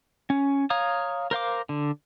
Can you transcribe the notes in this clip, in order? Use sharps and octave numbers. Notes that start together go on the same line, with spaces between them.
C#4
C#5 F5 A#5 D#6
A#4 C5 F5 D6
D3